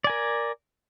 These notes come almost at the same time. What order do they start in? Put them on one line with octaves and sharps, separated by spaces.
D5 G#5 A#4